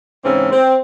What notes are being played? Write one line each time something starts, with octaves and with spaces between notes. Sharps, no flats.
G#2 C#3 E3 C4 C#4
C4